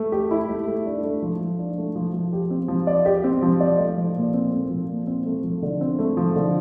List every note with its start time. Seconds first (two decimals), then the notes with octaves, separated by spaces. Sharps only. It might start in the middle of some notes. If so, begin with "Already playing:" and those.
Already playing: A3
0.12 G4
0.31 E4
0.49 A3
0.67 A3
0.86 D4
1.04 A3
1.22 F3
1.41 F3
1.59 D4
1.78 A3
1.95 F3
2.14 F3
2.33 G4
2.51 C4
2.68 F3
2.87 D5
3.06 G4
3.24 C4
3.42 F3
3.60 D5
3.78 A3
3.98 F3
4.16 A#2
4.34 C4
4.52 A3
4.70 F3
4.89 A#2
5.07 C4
5.26 A3
5.44 F3
5.62 D3
5.81 C4
5.99 A3
6.17 F3
6.36 D3